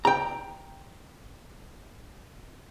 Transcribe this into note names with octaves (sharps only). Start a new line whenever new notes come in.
G5 A#5